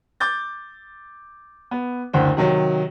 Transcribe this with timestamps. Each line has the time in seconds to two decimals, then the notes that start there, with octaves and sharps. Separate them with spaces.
0.20 D6 G6 A6
1.71 B3
2.13 F#1 D2 D3 C5 G5
2.37 C3 D#3 F#3